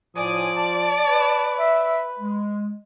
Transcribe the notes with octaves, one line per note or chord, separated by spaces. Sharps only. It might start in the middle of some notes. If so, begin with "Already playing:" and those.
A2 F3 D5 G#5 D#6
A5
B4
E5
G#3